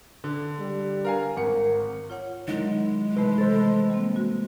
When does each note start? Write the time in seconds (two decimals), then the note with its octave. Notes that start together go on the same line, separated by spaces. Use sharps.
0.24 D3
0.59 G3
1.05 A#4 F5 G#5
1.36 G#1 A#4 F#5 C#7
2.10 F4 C#5 F#5
2.48 D#3 F#3 G#3 D#4 E4
3.17 C3 E3 A3 B4
3.38 A4 C5 A6
3.90 G3 A#3 C4
4.16 F#4